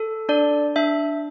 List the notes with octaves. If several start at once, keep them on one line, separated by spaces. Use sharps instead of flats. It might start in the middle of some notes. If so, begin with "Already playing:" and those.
Already playing: A4
D4 D5
D4 E5